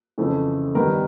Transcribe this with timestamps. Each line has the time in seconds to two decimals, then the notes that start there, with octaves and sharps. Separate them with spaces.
0.18 F2 C#3 E3 A3
0.75 G2 D#3 G3 B3 A#4